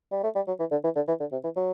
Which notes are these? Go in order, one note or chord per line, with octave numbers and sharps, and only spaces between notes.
G3
A3
G3
F#3
E3
D3
E3
D3
E3
D3
C3
E3
F#3